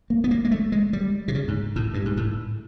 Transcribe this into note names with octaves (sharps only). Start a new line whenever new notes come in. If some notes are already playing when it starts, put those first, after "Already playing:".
A#3
B3
A#3
G#3
A3
G#3
G3
C3
C#3
G#2
A2
G2
G#2
A2